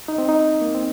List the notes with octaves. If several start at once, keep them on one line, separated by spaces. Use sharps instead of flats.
D#4
C4
D#4
A#3
C4